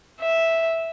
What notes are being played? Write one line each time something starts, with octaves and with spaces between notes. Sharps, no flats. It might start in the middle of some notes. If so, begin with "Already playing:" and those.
E5